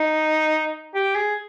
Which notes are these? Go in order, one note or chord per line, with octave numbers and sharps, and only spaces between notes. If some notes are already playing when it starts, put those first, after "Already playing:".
Already playing: D#4
G4
G#4